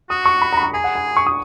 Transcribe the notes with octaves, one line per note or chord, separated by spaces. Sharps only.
F#4 D#6
C#6
B5
A#5
B5
A#5
G#4 G#5
F#5
G#5
C#6
D#6